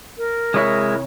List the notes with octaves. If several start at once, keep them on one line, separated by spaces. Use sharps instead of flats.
A#4
C3 G#3 E4 C#5